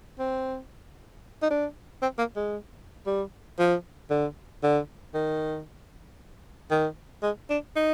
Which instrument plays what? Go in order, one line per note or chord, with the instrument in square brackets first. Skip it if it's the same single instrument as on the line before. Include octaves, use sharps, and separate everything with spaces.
[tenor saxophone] C4
D#4
D4
C4
A#3
G#3
G3
F3
D3
D3
D#3
D#3
G#3
D4
D#4